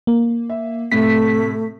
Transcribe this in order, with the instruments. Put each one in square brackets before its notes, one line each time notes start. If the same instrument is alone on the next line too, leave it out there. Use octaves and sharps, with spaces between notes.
[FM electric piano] A#3
[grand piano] E5
[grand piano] A2 C3 [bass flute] A3 [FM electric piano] B6